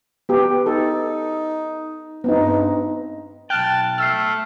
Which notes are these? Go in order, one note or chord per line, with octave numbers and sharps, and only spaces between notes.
B3 G4
D#4 A4
G2 B3 C4 D#4
B1 G5 A5 F6 F#6
A3 E6 F6 C7